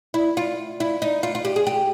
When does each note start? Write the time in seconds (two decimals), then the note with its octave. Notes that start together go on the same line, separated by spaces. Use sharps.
0.14 E4
0.37 F4
0.80 E4
1.02 D#4
1.23 F4
1.35 F4
1.45 G4
1.56 G#4
1.67 G4